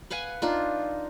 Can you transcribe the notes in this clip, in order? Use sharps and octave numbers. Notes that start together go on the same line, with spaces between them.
B4 F5 F#5 G#5
D4 D#4 F4